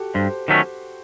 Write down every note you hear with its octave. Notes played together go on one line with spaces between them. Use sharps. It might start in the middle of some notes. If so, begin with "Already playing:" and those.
Already playing: F#4 G4 A4
G2 C5
D#3 F#3 A3 C#4